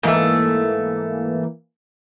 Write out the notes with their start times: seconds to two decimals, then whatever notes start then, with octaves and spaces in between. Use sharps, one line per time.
0.03 G#2 E3 A3 A#3